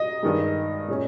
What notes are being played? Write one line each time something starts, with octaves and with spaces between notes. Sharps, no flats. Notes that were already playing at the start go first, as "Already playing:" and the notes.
Already playing: D#5
G2 D#3 G#3
A#2 G#3 C#4